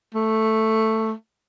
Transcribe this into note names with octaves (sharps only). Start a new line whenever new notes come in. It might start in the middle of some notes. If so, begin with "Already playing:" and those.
A3